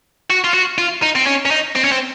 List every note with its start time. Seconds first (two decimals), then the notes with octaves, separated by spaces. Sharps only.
0.30 F#4
0.44 F4
0.54 F#4
0.78 F4
1.03 D#4
1.16 C4
1.26 C#4
1.46 C#4
1.51 D#4
1.76 C4
1.84 C#4
1.92 C4